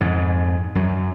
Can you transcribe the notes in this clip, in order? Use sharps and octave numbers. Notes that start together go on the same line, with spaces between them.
F2 G#2
F#2 F#3